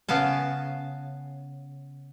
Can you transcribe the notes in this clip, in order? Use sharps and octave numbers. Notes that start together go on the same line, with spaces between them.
C#3 B3 F5 A5